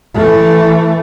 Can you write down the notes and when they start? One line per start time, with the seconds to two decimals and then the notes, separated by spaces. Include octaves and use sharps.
0.14 E3 A3